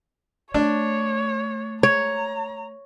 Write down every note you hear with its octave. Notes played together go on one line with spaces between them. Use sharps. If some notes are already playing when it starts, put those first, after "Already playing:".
A3 D4 C#5
C#5 A#5